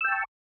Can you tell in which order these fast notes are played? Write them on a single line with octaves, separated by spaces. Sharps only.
E6 G5 A5 C#6